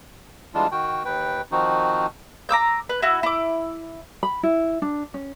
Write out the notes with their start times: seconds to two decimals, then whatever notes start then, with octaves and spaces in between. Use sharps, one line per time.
0.54 E3 G3 G#3 D4 F4
0.72 D#3 F#4 G5
1.05 D#2 B4 G5
1.52 D#3 F3 C4 D#4 F#4
2.49 A#5 D6 E6 G6
2.89 B4
3.02 E4 F#4
3.23 E4 D6
4.23 B5
4.43 E4
4.82 D4
5.14 C#4